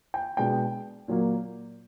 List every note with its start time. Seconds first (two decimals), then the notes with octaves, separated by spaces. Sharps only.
0.14 G5
0.37 B2 G#3 B3 D4 G5
1.08 A#2 F#3 A#3